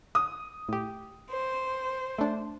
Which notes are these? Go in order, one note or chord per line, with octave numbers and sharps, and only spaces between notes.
D#6
A2 G4
C5
A3 D4